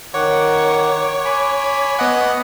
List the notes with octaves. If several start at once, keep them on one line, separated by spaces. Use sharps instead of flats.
D#3 C#5 F#5 D6
G#5 B5
B3 D#5 F#5